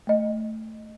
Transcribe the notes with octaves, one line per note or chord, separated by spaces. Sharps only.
A3 D#5